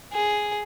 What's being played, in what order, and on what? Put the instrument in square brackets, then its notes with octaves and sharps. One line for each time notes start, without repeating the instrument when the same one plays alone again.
[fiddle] G#4